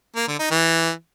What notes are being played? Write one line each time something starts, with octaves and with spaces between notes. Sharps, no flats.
A#3
D3
D#4
E3